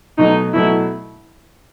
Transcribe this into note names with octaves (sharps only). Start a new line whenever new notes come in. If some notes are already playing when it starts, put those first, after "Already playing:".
B2 F#3 A3 D#4
B2 F#3 A3 E4